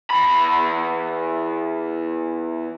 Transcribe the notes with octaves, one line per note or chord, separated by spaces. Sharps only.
E2 B5